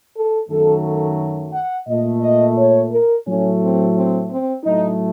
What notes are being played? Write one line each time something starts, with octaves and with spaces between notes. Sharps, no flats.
A4
F#2 D#3 F#3 A3 A4
A4
F#5
A#2 A3 D#5
D#5
C#5
A#4
A2 F#3 A3 C#4
C4
C4
C4
A2 F#3 A3 D#4